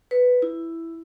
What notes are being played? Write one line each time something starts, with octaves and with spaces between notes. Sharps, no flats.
B4
E4